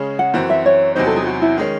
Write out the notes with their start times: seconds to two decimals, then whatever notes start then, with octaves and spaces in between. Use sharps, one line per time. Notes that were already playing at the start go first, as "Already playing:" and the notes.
Already playing: C#3 G#3 C#4 G#4
0.19 F#5
0.34 F#2 E3 C4 F#4
0.50 E5
0.66 C#5
0.95 E2 C3 F#3 C4 D#4 C5
1.06 A4
1.16 G#4
1.27 F#4
1.42 E4
1.57 D#3 G#3 C#4